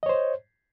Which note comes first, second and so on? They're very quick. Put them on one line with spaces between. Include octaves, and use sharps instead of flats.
D#5 C#5 C5